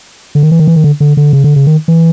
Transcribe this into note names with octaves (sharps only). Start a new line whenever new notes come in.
D3
D#3
E3
D#3
E3
D#3
D3
D3
D3
C#3
D3
C#3
D#3
E3